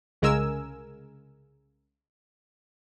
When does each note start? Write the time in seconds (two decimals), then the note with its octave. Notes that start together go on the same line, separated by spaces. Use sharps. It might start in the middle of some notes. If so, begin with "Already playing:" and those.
0.22 C2 C#3 G#3 A#4 G#5 E6